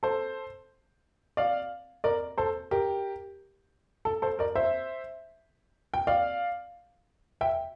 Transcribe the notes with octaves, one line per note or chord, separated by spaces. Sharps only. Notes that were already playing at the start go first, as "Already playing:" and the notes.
A4 C5
D5 F5
A#4 D5
A4 C5
G4 A#4
A4
A4 C5
A#4 D5
C5 E5
G5
D5 F5
E5 G5